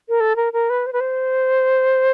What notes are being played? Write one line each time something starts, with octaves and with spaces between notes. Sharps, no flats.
A#4
A4
A#4
A#4
B4
C5
B4
C5